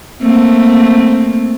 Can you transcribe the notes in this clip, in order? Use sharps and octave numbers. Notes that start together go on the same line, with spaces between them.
A3 A#3 C4